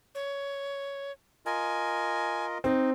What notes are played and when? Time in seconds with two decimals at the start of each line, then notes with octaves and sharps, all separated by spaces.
0.15 C#5
1.46 F4 A#4 D#5 G#5
2.64 C4 D#4